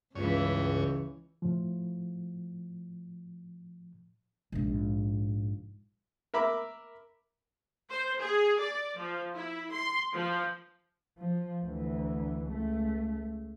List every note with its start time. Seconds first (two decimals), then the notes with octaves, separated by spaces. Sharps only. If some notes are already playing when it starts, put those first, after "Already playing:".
0.15 C#2 G2 C#3 E3 C#5
1.42 A2 F3
4.52 A#1 G#2
6.34 A#4 E5 B5 D6
7.90 C5
8.20 G#4
8.60 D5
8.98 F3
9.33 E4
9.72 C6
10.13 F3
11.18 F3
11.63 D2 E3
12.47 C#2 A3